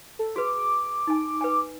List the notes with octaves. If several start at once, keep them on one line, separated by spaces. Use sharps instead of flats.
A4
F#4 G#4 B4 D6
D#4 G#5
B4 G5 G#5